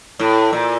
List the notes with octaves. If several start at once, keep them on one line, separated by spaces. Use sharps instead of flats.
A2
A#2